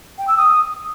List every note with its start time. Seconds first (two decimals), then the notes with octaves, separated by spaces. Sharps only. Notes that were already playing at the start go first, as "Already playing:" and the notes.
0.18 G5
0.28 E6
0.37 D#6